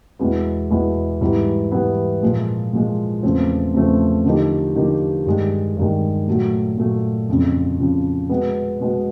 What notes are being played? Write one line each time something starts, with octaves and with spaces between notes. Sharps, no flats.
E2 B2 G#3 B3 E4
E2 B2 G#3 B3 E4
G#2 E3 G3 B3 E4
G#2 E3 G3 B3 E4
A#2 F3 G#3
A#2 F3 G#3
E2 C#3 F3 A3 C4
E2 C#3 F3 A3 C4
D3 F3 A#3 D#4 G4
D3 F3 A#3 D#4 G4
G2 D#3 G#3
G2 D#3 G#3
A#2 F#3 A3
A#2 F#3 A3
F2 C#3 F3
F2 C#3 F3
B2 G#3 B3
B2 G#3 B3